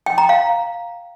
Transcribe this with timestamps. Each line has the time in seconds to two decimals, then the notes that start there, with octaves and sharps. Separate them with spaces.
0.06 G5
0.18 A#5
0.29 F5